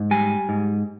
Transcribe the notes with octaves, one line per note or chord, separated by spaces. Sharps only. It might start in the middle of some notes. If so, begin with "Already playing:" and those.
Already playing: G#2
G3 G#5
G#2